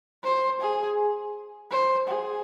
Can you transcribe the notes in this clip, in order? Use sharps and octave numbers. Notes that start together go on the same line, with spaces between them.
C5
G#4
C5
G#4